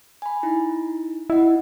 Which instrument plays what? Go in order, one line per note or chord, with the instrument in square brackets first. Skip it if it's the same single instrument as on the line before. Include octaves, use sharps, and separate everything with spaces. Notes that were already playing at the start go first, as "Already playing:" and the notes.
[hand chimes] G#5 B5
D#4 E4
[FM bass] E4 [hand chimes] D#5 F#5